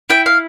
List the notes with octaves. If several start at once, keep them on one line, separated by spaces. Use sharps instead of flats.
E4 G5
F5